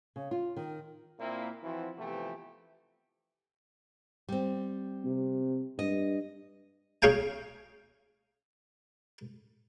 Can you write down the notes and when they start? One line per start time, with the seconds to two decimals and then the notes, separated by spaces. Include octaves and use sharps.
0.16 C#3
0.31 F4
0.57 D#3
1.20 A#2 A#3 C4 E4
1.63 E3 F3 C4 E4 F#4
1.98 C3 E3 F3 A3 B3 G4
4.29 G3 C4
5.05 C3
5.79 G2 D#5
7.02 C#4 G#4 F5 G5 G#5